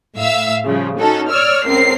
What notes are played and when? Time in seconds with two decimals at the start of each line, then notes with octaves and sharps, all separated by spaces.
0.18 A2 E5 F5 E6
0.65 C#3 F3 G3
0.99 C#4 D#4 F#4 A4
1.30 C#5 D5 E6 F6
1.66 C#2 C4 A#4 C7